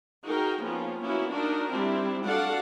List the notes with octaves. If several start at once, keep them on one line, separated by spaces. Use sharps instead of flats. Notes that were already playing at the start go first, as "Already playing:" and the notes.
D#4 F#4 G#4 A#4 G5
F3 A#3 B3 C#4 F4
A#3 B3 C#4 E4 F#4
D4 D#4 F#4 A#4
G3 C4 D4 E4
D4 F#4 A4 D5 F5 F#5